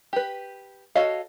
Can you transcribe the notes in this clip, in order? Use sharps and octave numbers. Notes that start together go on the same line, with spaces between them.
G4 B4
F#4 A4 C#5 D#5 F5